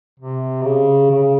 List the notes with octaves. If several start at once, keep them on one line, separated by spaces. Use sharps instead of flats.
C3
C#3
C#3